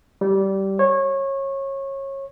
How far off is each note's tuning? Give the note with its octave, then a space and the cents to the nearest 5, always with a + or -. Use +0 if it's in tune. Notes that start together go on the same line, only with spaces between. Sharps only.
G3 -15
C#5 -25